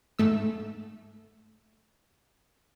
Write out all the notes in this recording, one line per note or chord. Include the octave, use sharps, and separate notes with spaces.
G#2 A3 E6